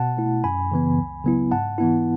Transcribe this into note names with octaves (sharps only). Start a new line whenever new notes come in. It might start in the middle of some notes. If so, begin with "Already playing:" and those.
Already playing: B2 F#5 A5
A3 E4
F#2 G#5 B5
C#3 E3 B3
C#2
C#3 F#3 B3 E4
G#2 F#5 A5
E3 B3 E4